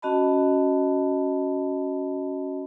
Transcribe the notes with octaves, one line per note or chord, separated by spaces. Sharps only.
C#4 F#4 D#5 A5 B5